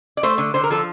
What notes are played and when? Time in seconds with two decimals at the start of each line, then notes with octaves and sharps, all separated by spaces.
0.17 D5
0.23 A3 C5
0.38 D3
0.54 D3 C5
0.64 A#4
0.71 F3 A4